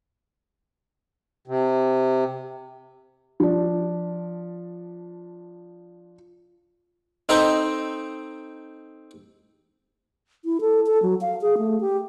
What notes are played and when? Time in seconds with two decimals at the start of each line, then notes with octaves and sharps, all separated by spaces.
1.47 C3
3.40 F3 D4
7.29 C4 D#4 A4 G5 A#5
10.45 E4
10.61 A4
10.87 A4
11.03 F#3
11.21 F5
11.42 G#4
11.58 A3
11.81 G4